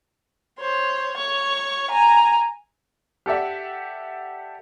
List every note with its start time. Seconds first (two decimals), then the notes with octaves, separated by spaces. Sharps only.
0.59 C5 C#5
1.17 C#5 C#6
1.90 G#5 A#5
3.26 G4 A4 D5 E5 F#5